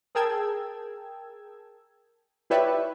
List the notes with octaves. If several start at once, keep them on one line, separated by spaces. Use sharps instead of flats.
G#4 A#4 G5 A5 E6 G#6
E4 G4 B4 C#5 D5 E5